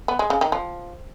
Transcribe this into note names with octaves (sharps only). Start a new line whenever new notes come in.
B3
G#3
C#3
D#3
F3